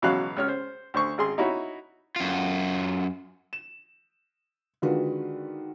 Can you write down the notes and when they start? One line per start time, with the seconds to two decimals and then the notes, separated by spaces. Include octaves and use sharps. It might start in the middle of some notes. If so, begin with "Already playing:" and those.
0.02 C#2 B2 E3 F#3 F5 F#6
0.37 C#2 C#5 F6
0.48 C5
0.94 D2 C5 C#6
1.18 G#1 G#4 C6
1.38 D#4 E4 F#4 C#5
2.16 F#2 F4
3.53 E7
4.82 D3 D#3 G#3 F4 F#4 B4